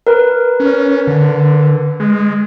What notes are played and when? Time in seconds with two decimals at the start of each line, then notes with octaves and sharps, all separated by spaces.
0.07 A#4 B4
0.60 C#4
1.07 D3
2.00 G#3